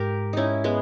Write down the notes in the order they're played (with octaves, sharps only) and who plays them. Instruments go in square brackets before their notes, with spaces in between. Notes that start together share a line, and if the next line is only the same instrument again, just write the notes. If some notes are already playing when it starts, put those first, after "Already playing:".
Already playing: [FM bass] G#2 [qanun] G4 A#4
[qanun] C#4 D#4 E4
G#3 B3